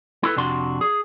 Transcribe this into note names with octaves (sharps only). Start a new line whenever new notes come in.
E4 A4 B4
F2 C3 D4 F#4 C6
G#4